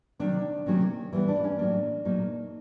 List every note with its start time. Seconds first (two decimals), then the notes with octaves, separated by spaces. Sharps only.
0.19 C3 D#3 F#3 D4
0.66 C3 D#3 F#3 A#3 C#4
1.13 E3 G3 B3 E4
1.28 D4
1.44 C#4
1.58 A2 F#3 A#3 D4
2.05 A#2 F#3 A#3 D#4